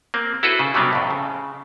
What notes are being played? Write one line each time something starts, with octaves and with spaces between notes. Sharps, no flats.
A#3 C4
E4 F#4 A4 B4 C5
C#3
C3 F#3 G3 B3 C4 D4
F2 A2
C#3